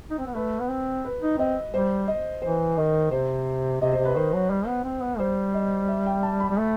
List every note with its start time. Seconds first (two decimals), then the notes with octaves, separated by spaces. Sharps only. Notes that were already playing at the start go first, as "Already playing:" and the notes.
0.10 D#4
0.19 C4
0.27 B3
0.35 A3 B4
0.60 B3
0.69 C4
1.05 B4
1.22 D#4
1.38 C4 D#5
1.73 G3 C5
2.08 D#5
2.42 E3 C5
2.77 D#3 D#5
3.11 C3 C5
3.82 C3 D#5
3.93 C5
3.98 C3
4.05 B4
4.16 D#3 C5
4.33 F#3
4.50 G3
4.67 B3
4.84 C4
5.03 B3
5.19 G3 C5
5.54 D#5
5.88 E5
6.06 G5
6.23 A5
6.40 B5
6.50 G3
6.57 A3